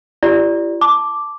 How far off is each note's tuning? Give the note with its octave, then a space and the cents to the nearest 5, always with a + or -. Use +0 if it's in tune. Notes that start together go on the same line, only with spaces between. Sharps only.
E4 +45 G4 -5 D5 -5
A5 +0 D6 +0